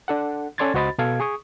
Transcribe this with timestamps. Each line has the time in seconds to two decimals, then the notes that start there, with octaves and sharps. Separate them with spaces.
0.08 D4 A4 F#5
0.58 C#4 A4 D5 C6 G#6 A6
0.74 C#2 F#4 C5 D#5 B5 A6
0.98 B2 A4 F5 G#6
1.20 G#4 C#6 D#6